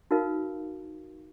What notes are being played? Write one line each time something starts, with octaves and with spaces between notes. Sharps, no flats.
D#4 F#4 A#4 B4 F5